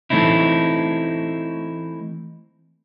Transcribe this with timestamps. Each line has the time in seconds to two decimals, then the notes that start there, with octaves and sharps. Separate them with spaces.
0.10 E3 A3 C4 D#4 E4